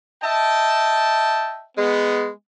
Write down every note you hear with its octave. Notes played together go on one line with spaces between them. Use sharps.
D#5 E5 G5 A5
G#3 B3